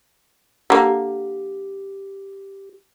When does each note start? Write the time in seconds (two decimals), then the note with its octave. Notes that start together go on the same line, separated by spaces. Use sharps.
0.70 D3 A#3 G4